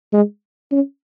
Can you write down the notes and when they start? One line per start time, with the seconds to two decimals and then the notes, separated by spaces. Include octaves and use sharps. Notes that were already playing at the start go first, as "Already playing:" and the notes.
0.13 G#3
0.72 C#4